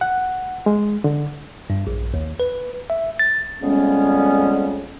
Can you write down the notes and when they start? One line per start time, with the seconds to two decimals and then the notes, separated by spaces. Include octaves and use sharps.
0.01 F#5
0.66 G#3
1.04 D3
1.70 G2
1.87 A#1
2.14 D#2
2.40 B4
2.90 E5
3.19 A6
3.61 F2 C#3 G3 G#3 B3 C#4